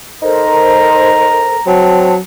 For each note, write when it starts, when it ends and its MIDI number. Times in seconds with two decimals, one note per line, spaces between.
0.22 1.48 63
0.22 1.56 69
0.22 1.56 70
0.22 1.56 72
0.22 1.71 82
1.67 2.18 54
1.67 2.14 60
1.67 2.17 81